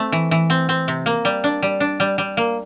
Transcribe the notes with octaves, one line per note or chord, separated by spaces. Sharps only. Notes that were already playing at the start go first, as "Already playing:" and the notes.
Already playing: A3 C4
E3
E3
C4
C4
C3
A#3
G3
D4
G3
D4
G3
G3
A#3